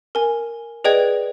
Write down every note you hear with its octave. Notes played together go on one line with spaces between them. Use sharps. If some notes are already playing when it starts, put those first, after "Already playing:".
A#4 G#5
G#4 B4 D5 D#5 G5 G#6